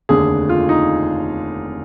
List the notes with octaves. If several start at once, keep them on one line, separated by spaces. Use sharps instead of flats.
F1 D#2 D3 G#4
F4
D#4